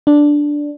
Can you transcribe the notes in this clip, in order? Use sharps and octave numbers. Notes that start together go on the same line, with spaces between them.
D4